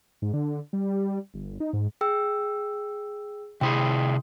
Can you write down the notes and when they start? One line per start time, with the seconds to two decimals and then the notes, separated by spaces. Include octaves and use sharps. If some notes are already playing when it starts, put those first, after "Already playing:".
0.22 G#2
0.33 D3
0.73 G3
1.34 G1
1.60 D#4
1.73 G#2
2.01 G#4 G5 E6
3.61 C3 E4 G#4 G5 C6 D#6